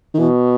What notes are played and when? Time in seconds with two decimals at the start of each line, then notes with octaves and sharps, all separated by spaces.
0.14 D#3
0.19 B2 E3